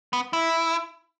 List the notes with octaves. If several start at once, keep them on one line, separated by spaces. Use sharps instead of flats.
B3
E4